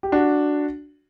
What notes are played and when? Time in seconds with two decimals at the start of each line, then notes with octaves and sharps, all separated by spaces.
0.03 G4
0.12 D4 F#4